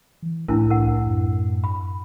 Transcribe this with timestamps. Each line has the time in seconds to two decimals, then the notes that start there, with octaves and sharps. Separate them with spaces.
0.22 E3
0.48 C2 A2 D4 E4 A#4
0.70 A#4 F#5
1.07 F#2
1.64 B5